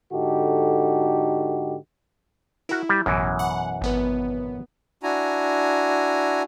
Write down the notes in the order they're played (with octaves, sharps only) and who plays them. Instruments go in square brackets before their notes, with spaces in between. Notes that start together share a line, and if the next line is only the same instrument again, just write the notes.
[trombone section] G#2 D3 D#4 F#4 G4 A4
[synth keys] E4 [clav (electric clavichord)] F#4 A#4
[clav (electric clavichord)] G3
[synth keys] A1 [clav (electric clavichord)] F#2 B2 E3
[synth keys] F#5
G#1 B3 B4
[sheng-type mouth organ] D4 E4 F#4 G#5 A#5